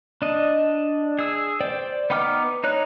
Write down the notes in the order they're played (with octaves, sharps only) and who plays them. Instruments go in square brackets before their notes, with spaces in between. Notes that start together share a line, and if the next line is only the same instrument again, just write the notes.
[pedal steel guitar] D4 D#5
G#4 E6
C5 D5 G5
B3 D#4 G5 D6 F6
D#4 C#5 F#6